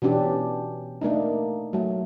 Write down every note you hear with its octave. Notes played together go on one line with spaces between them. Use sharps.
B2 E3 C#4 D4 G4
A3 A#3 D4 D#4
F#3 A3